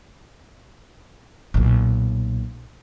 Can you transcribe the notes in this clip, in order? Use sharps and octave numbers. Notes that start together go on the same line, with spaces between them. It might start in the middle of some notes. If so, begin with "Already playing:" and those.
B1 A#2